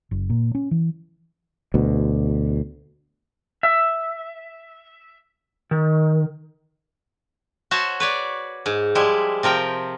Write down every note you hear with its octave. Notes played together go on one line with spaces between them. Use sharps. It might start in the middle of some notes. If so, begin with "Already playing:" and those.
F#1
A#2
C#4
E3
D2 B2
E5
D#3
F#4 C5 C#5 E5 A5
B4 C#5 D5
G#2
F3 G3 G#3 E4
C3 F3 A#4 G5